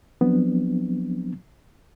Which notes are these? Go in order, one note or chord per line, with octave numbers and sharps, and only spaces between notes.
F3 F#3 B3 C4 D4